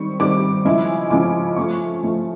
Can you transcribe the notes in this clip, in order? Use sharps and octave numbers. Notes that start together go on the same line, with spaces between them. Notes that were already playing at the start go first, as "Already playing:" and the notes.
Already playing: D#3 G3 C4 C#6
D#3 G3 C4 D6
C#3 F3 G#3 C#4 E4
C#3 F3 G#3 C#4 E4 D6
F3 A3 C#4 C#6
F3 A3 C#4